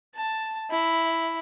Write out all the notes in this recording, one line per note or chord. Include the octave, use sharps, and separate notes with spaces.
A5
E4